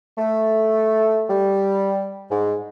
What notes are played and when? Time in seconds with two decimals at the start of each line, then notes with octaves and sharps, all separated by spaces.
0.18 A3
1.29 G3
2.30 G#2